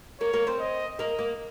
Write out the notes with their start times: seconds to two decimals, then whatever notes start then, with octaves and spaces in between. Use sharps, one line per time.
0.20 A#3 A#4 C#5
0.33 A#3 A#4
0.47 C4 C5
0.60 D#5
0.99 A#3 A#4 D#5
1.19 A#3 A#4